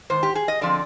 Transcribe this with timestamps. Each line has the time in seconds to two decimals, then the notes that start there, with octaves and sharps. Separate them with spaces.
0.10 G#2 D#3 C5
0.23 G4
0.35 G#4
0.48 D#5
0.61 D3 F3 C4 D5